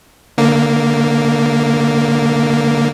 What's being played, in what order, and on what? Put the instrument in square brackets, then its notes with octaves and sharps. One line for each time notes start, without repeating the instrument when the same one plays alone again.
[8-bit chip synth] D3 A#3